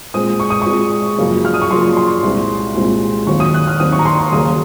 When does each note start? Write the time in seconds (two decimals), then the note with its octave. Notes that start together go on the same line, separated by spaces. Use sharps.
0.14 A#2 G#3 C4 D#6
0.40 C#6
0.50 D#6
0.62 A#2 G#3 C4 C#6
1.18 F#2 C#3 F3 A#3
1.45 F6
1.54 D#6
1.62 C#6
1.71 F#2 C#3 F3 A#3 C6
1.97 C6
2.23 C2 A#2 G#3 C4
2.75 C2 A#2 G#3 C4
3.27 D#2 D#3 F#3 C4 C#6
3.40 D#6
3.54 F#6
3.67 F6
3.80 D#2 D#3 F#3 C4 D#6
3.92 C#6
3.99 A#5
4.06 C6
4.19 C#6
4.32 D#2 C#3 F#3 A#3 D#6